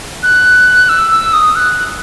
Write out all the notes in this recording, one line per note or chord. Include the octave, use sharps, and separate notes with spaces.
F#6
E6
E6
D#6
F#6